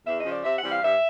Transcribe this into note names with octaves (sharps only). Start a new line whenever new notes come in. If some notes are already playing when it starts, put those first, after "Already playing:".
E2 E5
D#5
C#3 F3
D5
C3 E5
F#5
E3 G3 C4
F5
G2 E5